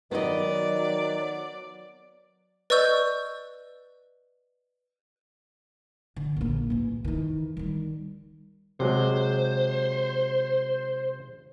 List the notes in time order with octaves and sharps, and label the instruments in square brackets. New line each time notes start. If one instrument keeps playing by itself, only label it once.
[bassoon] D#3 [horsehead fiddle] F#3 [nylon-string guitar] B3 D#5 [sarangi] D5
[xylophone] B4 D5 D#5 C#6 E6 G6
[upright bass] D3
A#1 A#3
A1 E3
D#3 E3
D#3 G3
[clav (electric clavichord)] C3 F#3 G#3 [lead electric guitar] C5